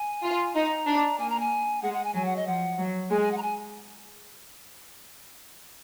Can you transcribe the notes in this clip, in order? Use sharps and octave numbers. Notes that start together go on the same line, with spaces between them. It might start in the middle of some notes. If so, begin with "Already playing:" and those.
Already playing: G#5
F4
D#4 A#5
D4
A#3 G#5
A#5
G#5
G#3 F#5
F#5
G#5
F#3 G#5
F#5
D#5
F3 F#5
F#3
G#3 G#5
G#5
F#5
A#5
G#5